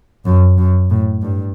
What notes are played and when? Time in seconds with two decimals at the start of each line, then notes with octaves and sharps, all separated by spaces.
0.25 F#2
0.58 F#2
0.90 A2
1.22 G2